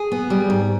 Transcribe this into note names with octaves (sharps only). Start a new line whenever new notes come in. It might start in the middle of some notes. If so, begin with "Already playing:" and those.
Already playing: G#4
B3
G3
G#2